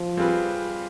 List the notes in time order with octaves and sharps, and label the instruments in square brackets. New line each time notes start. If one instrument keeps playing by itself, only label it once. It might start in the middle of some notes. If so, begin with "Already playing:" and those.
Already playing: [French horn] F3
[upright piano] G3 C4 F4 G#4 B4